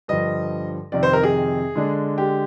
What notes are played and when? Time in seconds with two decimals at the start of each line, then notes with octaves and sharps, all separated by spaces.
0.08 G2 D3 F3 D#5
0.92 F2 C3 D#3 D5
1.03 C5
1.13 A#4
1.23 G#4
1.75 D3 G#3 D4
2.18 G4